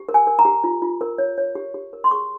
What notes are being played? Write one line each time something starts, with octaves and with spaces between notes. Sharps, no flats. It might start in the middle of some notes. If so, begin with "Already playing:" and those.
Already playing: G4
A#4
G#5
A#4
A#5
G4
F4
F4
A#4
C#5
C#5
G4
G4
A#4
C6
G#4 C#6